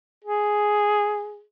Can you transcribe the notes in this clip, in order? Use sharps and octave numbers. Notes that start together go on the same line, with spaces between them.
G#4